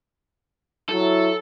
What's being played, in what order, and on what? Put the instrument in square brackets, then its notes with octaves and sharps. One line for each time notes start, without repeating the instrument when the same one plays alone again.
[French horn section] F#3 E4 [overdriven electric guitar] A4